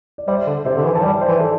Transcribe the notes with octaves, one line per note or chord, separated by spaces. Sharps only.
D5
G3 C5 E5
D3
C3 C5 E5
D3
E3
E3 A5
G3 D5 G5
C5 E5
E3
A4 D5